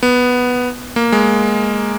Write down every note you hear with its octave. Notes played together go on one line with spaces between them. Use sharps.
B3
A#3
G#3